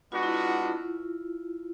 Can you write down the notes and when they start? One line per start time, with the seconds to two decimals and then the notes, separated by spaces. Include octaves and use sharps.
0.12 G#3 B3 D4 F4 F#4
0.23 E4
0.34 F4